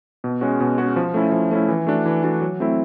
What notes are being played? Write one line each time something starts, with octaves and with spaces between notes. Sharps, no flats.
B2
G#3 C#4 F#4
B2
G#3 C#4 F#4
F3
A3 C#4 E4
F3
A3 C#4 E4
E3
A3 D4 F#4
E3
A3 D4 F#4
F#3
A3 C4 E4